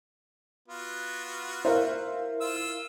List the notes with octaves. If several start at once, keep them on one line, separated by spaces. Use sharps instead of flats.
B3 F4 F#4
E4 A#4 C5 E5 F5
F4 E6